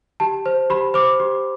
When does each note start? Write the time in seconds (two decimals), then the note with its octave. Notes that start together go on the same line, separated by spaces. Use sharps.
0.20 G4 A5
0.46 C5
0.70 G4 B5
0.94 C5 D6
1.20 G4